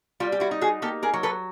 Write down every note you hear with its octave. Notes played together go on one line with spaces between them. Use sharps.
G3 F4
G4
E4 F#4
D#4
F#4 G#4
A#3 G4 A4
G#4 A#4
F#3
A4 B4